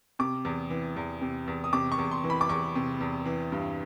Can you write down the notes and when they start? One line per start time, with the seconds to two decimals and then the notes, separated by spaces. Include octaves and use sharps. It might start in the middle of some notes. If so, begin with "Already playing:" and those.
0.19 C3 D6
0.45 E2
0.70 E3
0.97 E2
1.21 C3
1.48 E2
1.64 D#6
1.73 C3 D6
1.92 C#6
1.99 E2
2.11 C6
2.24 E3
2.30 B5
2.41 D6
2.49 E2 C#6
2.75 C3
3.01 E2
3.26 E3
3.52 G2